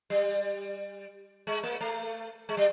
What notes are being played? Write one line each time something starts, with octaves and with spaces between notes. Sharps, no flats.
G3
G#3
A#3
A3
G#3
G3